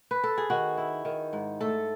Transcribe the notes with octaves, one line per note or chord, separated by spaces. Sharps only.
B4
A4
G#4
D#3 F#4
E4
D#3
G#2
A3 A4